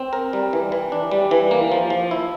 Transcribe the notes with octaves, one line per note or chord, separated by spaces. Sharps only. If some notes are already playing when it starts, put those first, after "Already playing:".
Already playing: C4
A#4
G3
E3
E3
D4
G3
E3
A#3
F3
F3
E4